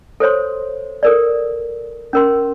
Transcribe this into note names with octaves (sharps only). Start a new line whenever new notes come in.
A4 C5 C#5 C6
A4 A#4 D5
C#4 A#4 C6